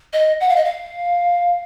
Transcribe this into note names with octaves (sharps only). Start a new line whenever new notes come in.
D#5
F#5
F5
D#5
F5